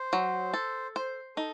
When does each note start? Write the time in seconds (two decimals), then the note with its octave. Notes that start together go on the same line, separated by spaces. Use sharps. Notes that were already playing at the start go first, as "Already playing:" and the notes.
Already playing: C5
0.13 F#3
0.54 A4
0.96 C5
1.37 D#4 A4